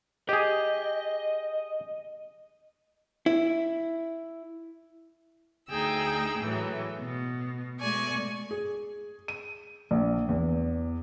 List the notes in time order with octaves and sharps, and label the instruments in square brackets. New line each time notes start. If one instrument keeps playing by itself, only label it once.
[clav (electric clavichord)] G4 G#4 [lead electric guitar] D#5
[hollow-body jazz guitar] E4
[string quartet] D2 D#4 G#4 G5 E6
A2 E3 F#3
B2
B2 G#3 A3 D5 G#5 C#6
[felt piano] G#4
D#7
A#1
E2